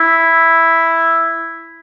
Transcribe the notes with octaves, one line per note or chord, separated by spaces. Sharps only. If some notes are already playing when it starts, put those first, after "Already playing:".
Already playing: E4